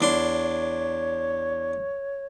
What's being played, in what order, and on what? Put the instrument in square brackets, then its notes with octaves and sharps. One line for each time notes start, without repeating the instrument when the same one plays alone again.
[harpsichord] E2 D4 C6 [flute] C#5